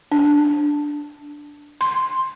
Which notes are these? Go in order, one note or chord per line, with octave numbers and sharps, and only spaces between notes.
D4
C6